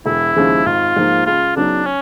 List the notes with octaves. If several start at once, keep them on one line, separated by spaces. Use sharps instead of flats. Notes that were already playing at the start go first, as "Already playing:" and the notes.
E1 E4
D#2 C#3 F3 G#3
G#1 F4
G#2 F3 A#3
C#2 F4
C#3 F#3 B3 D4 D#4
C#4